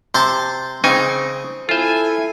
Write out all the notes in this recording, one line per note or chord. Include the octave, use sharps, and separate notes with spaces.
C3 C5 A5
C#3 C4 D#4 G#5
E4 F4 A4 C5 G#5